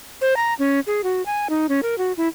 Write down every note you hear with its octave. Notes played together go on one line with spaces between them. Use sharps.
C5
A#5
C#4
G#4
F#4
G#5
D#4
C#4
A#4
F#4
E4